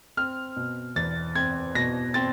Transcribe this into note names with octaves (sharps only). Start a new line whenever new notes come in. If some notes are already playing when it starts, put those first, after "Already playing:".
C4 F6
B2
E2 A6
C4 G#6
B2 A#6
C4 A6